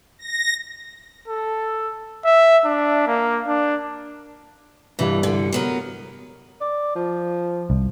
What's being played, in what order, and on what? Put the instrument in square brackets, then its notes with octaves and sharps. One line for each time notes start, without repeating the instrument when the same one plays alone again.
[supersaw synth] A#6
[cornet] A4
E5
D4
A#3
D4
[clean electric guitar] C2 G2 G3 [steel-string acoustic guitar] E3
[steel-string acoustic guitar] D3
F#3 B3 A#4
[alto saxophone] D5
F3
[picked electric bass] C2